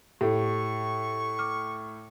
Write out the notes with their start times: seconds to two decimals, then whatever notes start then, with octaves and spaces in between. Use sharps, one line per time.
0.21 A2 G4 A4 C#6
1.39 D6 F6